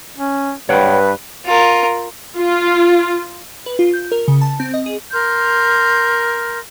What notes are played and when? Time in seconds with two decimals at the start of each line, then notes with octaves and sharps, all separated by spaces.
0.17 C#4
0.69 G2 B4 C#5 F#5 G5
1.45 F4 A#4
2.37 F4
3.66 B4
3.79 F4
3.93 G6
4.12 A#4
4.28 C#3
4.41 A5
4.60 C4
4.74 D#5
4.86 G#4
5.12 A#4 C6 F6 G6